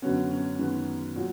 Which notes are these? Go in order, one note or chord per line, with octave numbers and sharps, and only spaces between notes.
F#2 D3 F#3 B3 C#4
C#4
F#2 D#3 G#3 B3
A#2 F#3